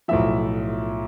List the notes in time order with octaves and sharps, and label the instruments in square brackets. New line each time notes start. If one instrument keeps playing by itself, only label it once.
[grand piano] B1 A2 F3 E5